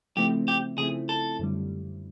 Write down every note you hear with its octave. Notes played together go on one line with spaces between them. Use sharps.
C#3 F3 A3 C4 E4 G4
G4
C#3 F3 A3 C4 E4 G#4
A4
F#2 D3 G3